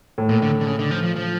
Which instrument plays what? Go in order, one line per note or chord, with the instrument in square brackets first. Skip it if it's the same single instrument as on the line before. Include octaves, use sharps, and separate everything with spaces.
[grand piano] A2
[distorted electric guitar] A#2
D3
D3
C#3
D3
F3
F3
F3